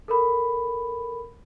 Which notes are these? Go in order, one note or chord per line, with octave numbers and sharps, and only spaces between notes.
A4 A#4 B5